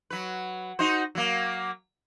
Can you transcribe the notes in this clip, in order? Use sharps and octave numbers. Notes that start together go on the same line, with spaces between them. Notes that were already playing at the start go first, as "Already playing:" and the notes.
F#3 B4
D#4 F#4 C5
F#3 A#3